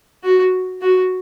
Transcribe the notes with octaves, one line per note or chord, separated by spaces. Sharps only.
F#4
F#4